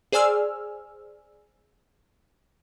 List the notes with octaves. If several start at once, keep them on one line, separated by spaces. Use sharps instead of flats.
G#4 C5 D5 G#5 E6 F6